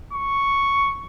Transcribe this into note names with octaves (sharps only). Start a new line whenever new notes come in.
C#6